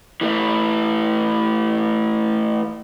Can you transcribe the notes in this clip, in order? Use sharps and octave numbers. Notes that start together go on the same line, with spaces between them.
E3 A3